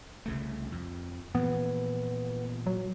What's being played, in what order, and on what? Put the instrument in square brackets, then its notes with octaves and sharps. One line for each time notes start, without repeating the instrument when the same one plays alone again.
[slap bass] C2 C#3 A3
F2
[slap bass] A#2 E3 F3 [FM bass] B3
[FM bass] F#3